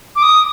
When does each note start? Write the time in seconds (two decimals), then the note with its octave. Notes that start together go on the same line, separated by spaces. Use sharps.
0.16 D6
0.23 D#6